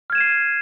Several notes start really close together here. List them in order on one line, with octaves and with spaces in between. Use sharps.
F6 G#6 E7 D#7 C7